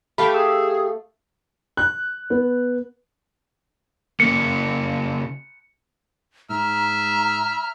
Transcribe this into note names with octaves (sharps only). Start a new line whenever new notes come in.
A3 G4 F5 B5
G#4 E6
F#6
B3
C#3 A#3 C#7
G#2 E5 A#5 F6